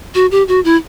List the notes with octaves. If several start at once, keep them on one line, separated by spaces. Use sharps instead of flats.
F#4
G4
F#4
E4